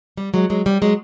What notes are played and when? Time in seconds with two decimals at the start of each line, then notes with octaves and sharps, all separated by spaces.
0.17 G3
0.34 F#3 G#3
0.50 F#3 G#3
0.66 G3
0.82 F#3 G#3